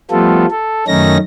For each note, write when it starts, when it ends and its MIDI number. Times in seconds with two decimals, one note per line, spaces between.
0.11 0.46 53
0.11 0.46 55
0.11 0.46 57
0.11 0.46 59
0.11 0.46 65
0.11 0.46 69
0.51 0.85 69
0.88 1.17 42
0.88 1.17 51
0.88 1.17 57
0.88 1.17 61
0.88 1.17 63
0.88 1.17 94